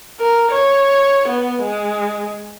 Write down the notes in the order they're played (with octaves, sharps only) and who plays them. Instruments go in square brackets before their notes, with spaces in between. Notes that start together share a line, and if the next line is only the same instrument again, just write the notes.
[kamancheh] A#4
C#5
B3
G#3